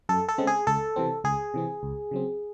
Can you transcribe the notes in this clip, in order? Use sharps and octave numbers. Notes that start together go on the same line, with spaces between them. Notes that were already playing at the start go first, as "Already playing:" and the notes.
F#2 A4
A4
C#3 G#3 C4
G#4
C#2 A4
C3 E3 C4
C#2 G#4
C3 E3 C4
C#2
C#3 F#3 C4